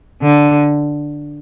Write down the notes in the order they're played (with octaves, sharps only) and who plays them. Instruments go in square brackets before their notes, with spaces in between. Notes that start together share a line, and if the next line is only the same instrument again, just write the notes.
[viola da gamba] D3